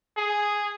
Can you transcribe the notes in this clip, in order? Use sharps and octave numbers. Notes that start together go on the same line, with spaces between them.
G#4